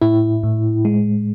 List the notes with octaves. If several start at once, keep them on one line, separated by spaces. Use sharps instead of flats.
A2 E4
A2
G#3